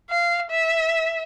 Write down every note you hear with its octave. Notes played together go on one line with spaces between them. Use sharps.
F5
E5